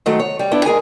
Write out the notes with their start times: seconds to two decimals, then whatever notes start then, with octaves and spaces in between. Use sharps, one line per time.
0.06 D#3 F#3 G#3 A3
0.19 C#5
0.39 G3
0.51 B3 D4 E4
0.65 G#3 G#4 A#4 G#5